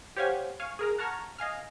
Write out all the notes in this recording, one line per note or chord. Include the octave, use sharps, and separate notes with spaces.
G4 C5 C#5 F5 F#5 G#5
F5 G#5 C#6
G#4 A#4 A#5
F#5 A5 A#5 C#6 F6 G#6
D#5 F5 G#5 F6